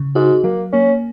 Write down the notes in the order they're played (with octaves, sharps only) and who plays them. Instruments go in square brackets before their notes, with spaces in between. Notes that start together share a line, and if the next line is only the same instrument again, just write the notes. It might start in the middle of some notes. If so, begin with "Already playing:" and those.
Already playing: [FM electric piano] C#3
[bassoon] G#2 [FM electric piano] F#4
[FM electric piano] F#3 [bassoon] A#3
[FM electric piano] A#3 [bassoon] C#4